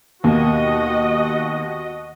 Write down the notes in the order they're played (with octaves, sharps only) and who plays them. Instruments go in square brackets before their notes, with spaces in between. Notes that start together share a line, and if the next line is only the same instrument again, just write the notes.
[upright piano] D#2 B2 A#3 [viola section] F#4 D#5